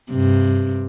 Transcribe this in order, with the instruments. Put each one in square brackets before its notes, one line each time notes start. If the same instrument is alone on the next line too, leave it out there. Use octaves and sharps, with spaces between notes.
[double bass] G2 [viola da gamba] C3